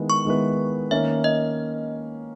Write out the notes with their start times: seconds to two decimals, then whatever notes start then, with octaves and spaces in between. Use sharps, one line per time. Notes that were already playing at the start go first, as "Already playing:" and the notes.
Already playing: D#3 G#3 B3 E4 B4
0.10 C#6
0.25 D#3 G#3 B3 E4 B4
0.91 D#3 A#3 C#4 E5
1.24 D#5